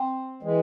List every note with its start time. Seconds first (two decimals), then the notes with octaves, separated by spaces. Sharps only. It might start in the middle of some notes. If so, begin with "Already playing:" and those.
Already playing: C4
0.43 E3 G#3